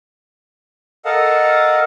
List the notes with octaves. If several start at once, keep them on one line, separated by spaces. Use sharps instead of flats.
A4 A#4 D#5 F5 F#5 A5